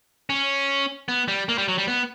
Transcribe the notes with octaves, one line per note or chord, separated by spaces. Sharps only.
C#4
B3
G3
A#3
G3
F#3
G3
B3